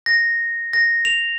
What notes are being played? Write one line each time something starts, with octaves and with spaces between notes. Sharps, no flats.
A#6
A#6
F7